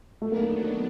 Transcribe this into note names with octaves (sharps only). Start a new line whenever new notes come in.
D#2 D#3 F#3 A3 B3 D4
A#3
A#3